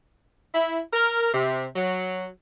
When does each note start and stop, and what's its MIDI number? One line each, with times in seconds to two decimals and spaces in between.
0.55 0.79 64
0.93 1.32 70
1.34 1.66 48
1.76 2.26 54